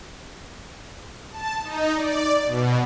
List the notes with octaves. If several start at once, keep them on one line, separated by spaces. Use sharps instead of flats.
A5
D#4
D5
B2